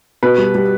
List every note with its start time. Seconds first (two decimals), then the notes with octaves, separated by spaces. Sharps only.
0.23 B2 B4
0.38 G3
0.55 G3